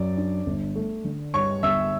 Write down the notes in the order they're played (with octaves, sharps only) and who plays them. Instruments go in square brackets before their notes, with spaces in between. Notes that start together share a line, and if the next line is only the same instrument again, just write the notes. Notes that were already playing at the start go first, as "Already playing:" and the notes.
Already playing: [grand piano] F#2 [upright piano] D5
[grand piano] D4
G1
A3
D3
[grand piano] G2 [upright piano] C#5 C#6
[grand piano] G1 [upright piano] E5 E6